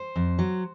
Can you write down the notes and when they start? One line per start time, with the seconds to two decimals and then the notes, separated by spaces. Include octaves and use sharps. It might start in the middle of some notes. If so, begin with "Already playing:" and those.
Already playing: C5
0.16 F2
0.39 F#3